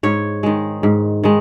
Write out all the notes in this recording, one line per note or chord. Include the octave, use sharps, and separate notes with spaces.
G#2 C#5
D#3 G#3
G#2
D#3 G#3